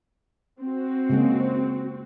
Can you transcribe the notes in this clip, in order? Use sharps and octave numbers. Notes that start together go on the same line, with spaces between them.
C4 F#4
C#3 G#3 A#3